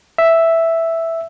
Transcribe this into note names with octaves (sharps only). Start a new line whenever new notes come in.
E5